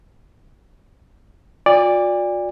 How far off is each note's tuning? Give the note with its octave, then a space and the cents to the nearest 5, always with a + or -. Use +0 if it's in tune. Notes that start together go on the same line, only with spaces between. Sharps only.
F4 +45 D5 +0 G#5 -45